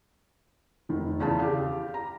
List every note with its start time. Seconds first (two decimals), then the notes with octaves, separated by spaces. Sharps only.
0.89 F1 D#3
1.20 E2 C#3 F4 A5
1.40 G4 F5
1.94 A#5